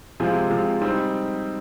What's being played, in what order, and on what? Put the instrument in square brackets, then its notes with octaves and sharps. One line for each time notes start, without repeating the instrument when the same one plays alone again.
[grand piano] C3 F3 G#3 C4
C3 F3 G#3 C4
G3 C4 D#4